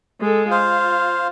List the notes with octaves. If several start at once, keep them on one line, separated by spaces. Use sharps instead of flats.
G#3 A4
F4 C5 F5